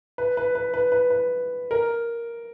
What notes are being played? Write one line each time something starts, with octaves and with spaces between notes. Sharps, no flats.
B4
B4
B4
B4
B4
B4
A#4